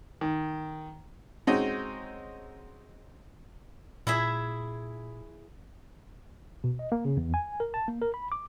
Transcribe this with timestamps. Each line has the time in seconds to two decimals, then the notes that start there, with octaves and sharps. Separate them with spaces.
0.21 D#3
1.47 G#3 C4 C#4 D#4 F#4
4.07 A#2 E4 G#4 E5
6.64 B2
6.79 D#5
6.92 A#3
7.05 C#3
7.17 E2
7.34 G#5
7.60 A#4
7.74 A5
7.88 A#3
8.02 A#4
8.14 B5
8.32 D6